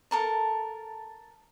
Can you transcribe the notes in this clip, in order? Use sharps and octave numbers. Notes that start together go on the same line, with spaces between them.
A4 A#4 A5